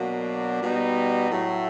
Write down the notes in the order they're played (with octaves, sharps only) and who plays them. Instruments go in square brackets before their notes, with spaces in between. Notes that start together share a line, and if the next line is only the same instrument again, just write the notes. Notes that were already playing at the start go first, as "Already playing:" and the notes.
Already playing: [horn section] B2 F#3 A#3 D4
B2 G3 B3 D#4
A2 F#3 A3